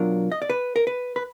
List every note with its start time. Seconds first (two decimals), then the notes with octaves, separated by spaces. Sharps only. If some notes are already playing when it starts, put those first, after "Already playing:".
Already playing: B2 F#3 D4 F4 A#4
0.32 D#5
0.42 D5
0.50 B4
0.76 A#4
0.87 B4
1.16 B4